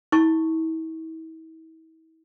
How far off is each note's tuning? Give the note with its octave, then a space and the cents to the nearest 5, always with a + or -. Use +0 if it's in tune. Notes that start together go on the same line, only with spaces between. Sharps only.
E4 -40 C#6 +0